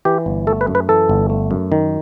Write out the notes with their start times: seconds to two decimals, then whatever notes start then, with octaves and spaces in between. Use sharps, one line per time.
0.05 E3 G4
0.26 G1
0.47 A3 A4
0.61 B4
0.67 F#2
0.75 B4
0.89 E3 A4
1.09 G1
1.30 A3
1.51 F#2
1.72 D#3